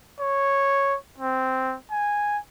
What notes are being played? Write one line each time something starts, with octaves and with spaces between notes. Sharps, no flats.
C#5
C4
G#5